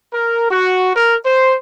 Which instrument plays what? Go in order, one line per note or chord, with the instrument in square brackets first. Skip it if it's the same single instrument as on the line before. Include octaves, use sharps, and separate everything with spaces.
[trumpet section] A#4
F#4
A#4
C5